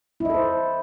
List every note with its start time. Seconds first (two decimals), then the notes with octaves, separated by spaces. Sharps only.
0.20 E4
0.25 D#5
0.30 A4
0.34 C5